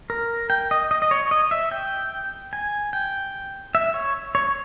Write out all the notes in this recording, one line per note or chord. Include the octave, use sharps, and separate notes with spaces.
A#4
G5
D#5
D#5
D#5
C#5
D#5
E5
G5
G#5
G5
E5
C#5
C#5